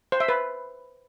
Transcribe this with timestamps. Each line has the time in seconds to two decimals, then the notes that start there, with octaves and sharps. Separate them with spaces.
0.12 C5
0.20 E5
0.29 B4